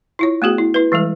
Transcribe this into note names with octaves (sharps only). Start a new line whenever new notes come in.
E4 F4 C#5
A3 B3 F#4 G#4
E4
E4 B4
E3 G3 G#3 A4